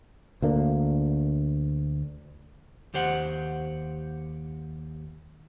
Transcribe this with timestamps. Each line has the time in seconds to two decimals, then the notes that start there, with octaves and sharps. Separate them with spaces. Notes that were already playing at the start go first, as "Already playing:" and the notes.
0.42 D2 A#3 D4
2.94 D#2 G4 C5 F#5